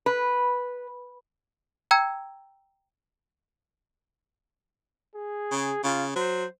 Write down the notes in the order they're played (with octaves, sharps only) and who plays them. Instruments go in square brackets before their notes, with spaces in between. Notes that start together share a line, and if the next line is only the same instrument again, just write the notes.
[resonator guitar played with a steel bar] B4
[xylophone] G5 A#5 E6 G#6
[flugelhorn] G#4
[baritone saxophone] C#3
[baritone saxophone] C#3 [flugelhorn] F4
[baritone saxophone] F#3 [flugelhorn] C5